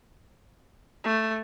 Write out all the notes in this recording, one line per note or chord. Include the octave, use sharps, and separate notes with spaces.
A3